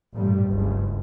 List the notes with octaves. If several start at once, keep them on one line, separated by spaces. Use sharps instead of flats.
A1 G2 A#2 G3
F#1 C#2 G2